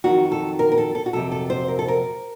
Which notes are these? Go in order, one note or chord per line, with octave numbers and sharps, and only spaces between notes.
F2 D#3 F#3 F#4
A4
A#4
A#4
A4
A4
F#4
F2 C3 F#3 A4
A4
C5
A#4
A4
A#4